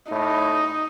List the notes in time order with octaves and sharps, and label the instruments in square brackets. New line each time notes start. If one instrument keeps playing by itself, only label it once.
[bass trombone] A2 [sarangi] D#4